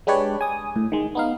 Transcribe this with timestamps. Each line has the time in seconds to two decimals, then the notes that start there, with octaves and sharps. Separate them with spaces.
0.07 G#3 D4 G4 B4 C#5 D5
0.41 G#5 D#6
0.76 A2
0.92 D#3 G#3
1.15 B3 D#4 F5